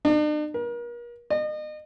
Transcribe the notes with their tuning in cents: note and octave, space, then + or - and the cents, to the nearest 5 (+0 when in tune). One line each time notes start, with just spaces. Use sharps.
D4 +45
A#4 +40
D#5 -35